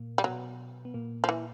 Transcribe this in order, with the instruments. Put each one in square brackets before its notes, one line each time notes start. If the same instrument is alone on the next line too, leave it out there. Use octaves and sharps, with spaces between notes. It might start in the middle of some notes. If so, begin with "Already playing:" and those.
Already playing: [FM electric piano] A#2 A#3
[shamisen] G3
[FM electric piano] B2 B3 [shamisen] F#3
[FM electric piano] B3
A#2 A#3
[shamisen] F3
E3